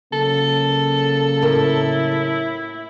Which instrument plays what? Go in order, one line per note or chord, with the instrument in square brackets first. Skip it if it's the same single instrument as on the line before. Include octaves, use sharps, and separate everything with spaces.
[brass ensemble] C#3 F#3 A#3 [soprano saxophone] A4
[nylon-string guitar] A2 A#4 [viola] E4